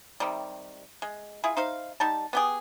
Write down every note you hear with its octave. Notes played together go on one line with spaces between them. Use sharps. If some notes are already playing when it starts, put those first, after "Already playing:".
C3 D#3 G3
G#3
E4 F4 G#4
D#4 C5 F5
G3 D#4 A5
B3 G4 G#4